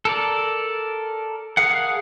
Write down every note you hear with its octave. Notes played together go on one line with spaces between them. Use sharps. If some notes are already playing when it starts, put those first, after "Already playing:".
A4 A#4 D5
G#4 A#4 F5 F#5